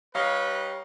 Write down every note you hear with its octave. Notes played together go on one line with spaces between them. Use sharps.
G3 D#4 B4 C#5 F5